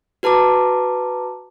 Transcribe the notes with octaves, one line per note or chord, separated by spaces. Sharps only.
F#4 B4 A5 A#5 D6